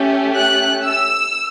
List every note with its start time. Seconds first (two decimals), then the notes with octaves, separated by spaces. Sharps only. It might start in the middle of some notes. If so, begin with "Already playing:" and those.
Already playing: A3 C#4 G4
0.34 F#6
0.84 E6